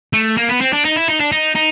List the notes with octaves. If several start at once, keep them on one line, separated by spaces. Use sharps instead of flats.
A3
A#3
B3
C4
D4
D#4
E4
D#4
D4
D#4
D#4